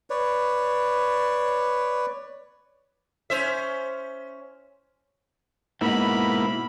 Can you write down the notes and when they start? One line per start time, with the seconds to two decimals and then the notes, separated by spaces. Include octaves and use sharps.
0.10 B4 C#5 D5
3.30 C#4 C5 E5
5.81 G#2 B2 A#3 E4 B5